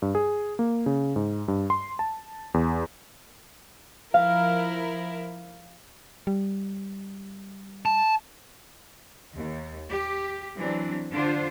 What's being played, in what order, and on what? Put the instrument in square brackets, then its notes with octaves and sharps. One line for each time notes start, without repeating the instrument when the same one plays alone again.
[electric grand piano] G2
G#4
A#3
C#3
G#2
G2
C6
A5
E2
[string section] F3 E4 A#4 [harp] F5
[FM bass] G3
[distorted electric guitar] A5
[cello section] D#2
G4
E3 F#3 C4 D4
D3 D4 F4 C5